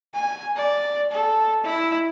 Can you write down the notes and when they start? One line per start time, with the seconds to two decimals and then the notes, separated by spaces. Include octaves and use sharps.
0.14 G#5
0.56 D5
1.11 A4
1.64 E4